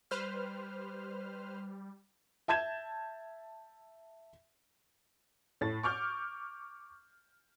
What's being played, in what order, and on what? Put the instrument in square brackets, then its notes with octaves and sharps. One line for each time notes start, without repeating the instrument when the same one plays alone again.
[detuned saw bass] G3 [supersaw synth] B4 C5 F6
[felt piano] E5 A5 G6 G#6 E7
[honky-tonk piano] A2 A6
C#6 D6 F6 G6